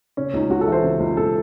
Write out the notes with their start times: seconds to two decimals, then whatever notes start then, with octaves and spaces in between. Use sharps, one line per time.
0.17 C#3 C#4
0.34 C#2 D#4
0.50 C#2 F#4
0.61 A4
0.67 E3
0.72 C5
0.84 C#3
1.00 C#2
1.17 C#2 A4